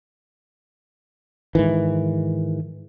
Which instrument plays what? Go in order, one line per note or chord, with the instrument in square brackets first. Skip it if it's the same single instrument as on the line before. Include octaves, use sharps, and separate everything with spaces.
[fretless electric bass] G#2 D#3 E3